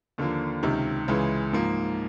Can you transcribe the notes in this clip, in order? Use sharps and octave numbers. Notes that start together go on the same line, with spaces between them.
D#2 D3 F3 A#3
C#2 C3 D#3
C#2 C#3 E3 G#3
G#2 F3 A#3